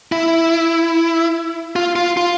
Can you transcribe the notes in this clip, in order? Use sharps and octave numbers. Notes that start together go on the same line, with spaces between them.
E4
F4
F4
F4